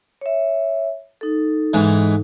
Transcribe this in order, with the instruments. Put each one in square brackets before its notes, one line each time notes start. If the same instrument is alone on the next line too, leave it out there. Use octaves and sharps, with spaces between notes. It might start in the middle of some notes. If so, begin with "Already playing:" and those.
[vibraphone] C#5 E5
D#4 A4
[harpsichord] G#2 E3 G#3